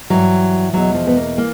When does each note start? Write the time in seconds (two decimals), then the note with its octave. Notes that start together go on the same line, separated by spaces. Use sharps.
0.10 G2 E3 F#3
0.73 E2 B2 F#3
0.95 F3
1.07 B3
1.16 A#3
1.37 E3 A#3